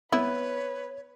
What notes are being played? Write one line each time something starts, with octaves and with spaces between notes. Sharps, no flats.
B3 E4 B4 C#5